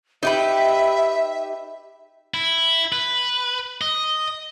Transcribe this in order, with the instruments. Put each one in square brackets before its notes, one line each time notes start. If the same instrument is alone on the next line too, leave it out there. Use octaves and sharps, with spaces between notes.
[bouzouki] D#4 G4 B4 [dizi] E5
[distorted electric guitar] E4
B4
D#5